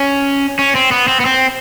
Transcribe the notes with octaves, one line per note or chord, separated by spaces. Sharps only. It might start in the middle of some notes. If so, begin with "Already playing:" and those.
Already playing: C#4
C#4
C4
B3
C4
B3
C4